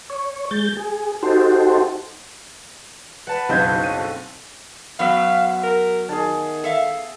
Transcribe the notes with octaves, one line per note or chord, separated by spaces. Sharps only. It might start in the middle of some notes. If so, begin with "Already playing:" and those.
C#5
G#3 G6 A6
G#4
D#4 F#4 G4 A4 C5
B4 F#5 A5
F#1 B1 C4 D#5 G6 G#6
C#5 D#7
A4
F#2 F#3 B3 E5 F5
A#4
D#3 G#4 A5
A4 E5 F5